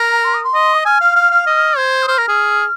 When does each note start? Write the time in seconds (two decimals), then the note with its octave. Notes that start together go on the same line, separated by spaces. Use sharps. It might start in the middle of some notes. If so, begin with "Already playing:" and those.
Already playing: A#4 A#5
0.24 C6
0.33 D#6
0.43 C6
0.54 D#5
0.73 D#6
0.85 G#5 F6
1.01 F5
1.16 F5
1.31 F5
1.46 D#5
1.77 C5 G#6
2.02 D#6
2.08 C5 F6
2.18 A#4
2.28 G#4